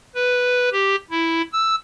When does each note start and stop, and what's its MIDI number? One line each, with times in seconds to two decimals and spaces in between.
0.15 0.69 71
0.72 0.96 67
1.11 1.42 64
1.53 1.76 88